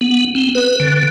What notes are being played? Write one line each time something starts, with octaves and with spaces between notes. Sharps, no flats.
B3
C4
B4
D3